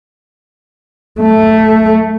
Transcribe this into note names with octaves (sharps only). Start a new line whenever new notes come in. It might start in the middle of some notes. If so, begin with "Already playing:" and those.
A3